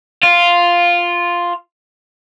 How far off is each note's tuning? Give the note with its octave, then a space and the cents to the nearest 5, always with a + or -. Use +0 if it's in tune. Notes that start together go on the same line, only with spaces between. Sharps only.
F4 +0 F5 +0